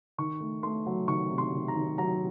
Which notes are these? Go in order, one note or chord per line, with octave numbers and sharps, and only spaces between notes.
D#3 C#6
A3
A3 C6
F#3
D#3 C#6
C3
C6
D#3
A#5
D#3
F#3 A#5